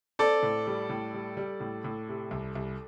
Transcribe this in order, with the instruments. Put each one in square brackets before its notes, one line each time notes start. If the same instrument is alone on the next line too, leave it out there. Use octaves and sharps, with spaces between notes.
[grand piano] C4 [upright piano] A4 D5
[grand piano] A2
G3
A2
G3
G3
A2
A2
C3
C2
C2